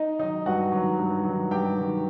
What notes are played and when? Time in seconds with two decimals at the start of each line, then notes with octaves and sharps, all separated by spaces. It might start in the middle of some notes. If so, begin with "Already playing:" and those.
Already playing: D#4 D#5
0.19 D#3 F#3 D#4 D#5
0.46 G2 F#4 F#5
0.72 D#3 F#3
0.98 G2
1.25 D#3 F#3
1.51 G2 G4 G5
1.77 D#3 F#3